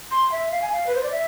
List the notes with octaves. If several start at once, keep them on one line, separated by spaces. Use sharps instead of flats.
C6
E5
F5
G#5
F5
B4
C5
D5
E5